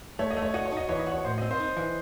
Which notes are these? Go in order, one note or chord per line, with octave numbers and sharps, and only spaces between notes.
A3 C#5
D#5
A3
C#5
F#4 D#5
C#5
D#4 D#5
E3 C#5
D#5
F#4
C#5
A2 C5
D#5
C4
C5
D#4
E3 D#5